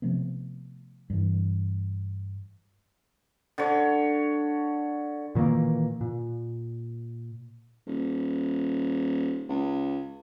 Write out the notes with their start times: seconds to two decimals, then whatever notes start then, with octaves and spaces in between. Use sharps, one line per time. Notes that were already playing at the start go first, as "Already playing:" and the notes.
0.02 C3 F3 A3 B3
1.10 G2 E3
3.58 D3 C#5
5.35 A#2 D#3 E3 A#3
6.01 A#2
7.87 D#1
9.49 C#2